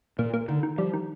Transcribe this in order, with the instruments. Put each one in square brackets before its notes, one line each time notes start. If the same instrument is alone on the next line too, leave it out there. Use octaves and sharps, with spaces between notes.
[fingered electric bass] A#2 [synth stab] A#3
[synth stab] A#3
[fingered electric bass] D3 [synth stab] D#3
[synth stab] D#3
[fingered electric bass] F3 [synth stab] G3
[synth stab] D#3